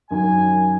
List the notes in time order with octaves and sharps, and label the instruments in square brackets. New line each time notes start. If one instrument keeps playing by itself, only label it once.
[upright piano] F#2 D#3 F#3 [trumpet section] G#5